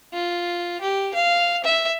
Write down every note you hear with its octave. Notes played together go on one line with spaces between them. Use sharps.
F4
G4
F5
E5